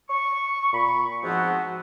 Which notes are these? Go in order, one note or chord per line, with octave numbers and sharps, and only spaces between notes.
C#6
A#2 B5 C#6
G#2 F3 B3 C4 F#4